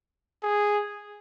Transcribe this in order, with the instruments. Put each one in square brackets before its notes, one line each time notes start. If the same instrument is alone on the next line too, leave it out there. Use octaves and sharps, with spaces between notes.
[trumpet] G#4